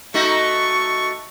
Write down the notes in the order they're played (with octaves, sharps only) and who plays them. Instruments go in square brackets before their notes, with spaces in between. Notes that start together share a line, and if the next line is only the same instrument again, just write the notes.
[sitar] A3 D#4 F#4 [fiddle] C#6